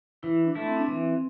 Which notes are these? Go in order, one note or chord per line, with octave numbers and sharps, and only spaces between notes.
E3 E4
D4
A3 E4
C4
D4
E3 C4